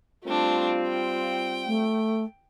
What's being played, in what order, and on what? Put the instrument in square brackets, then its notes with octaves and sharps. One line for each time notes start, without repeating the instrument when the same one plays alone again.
[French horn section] G3 C4 F4 [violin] A3 D4
[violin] G5
[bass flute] A3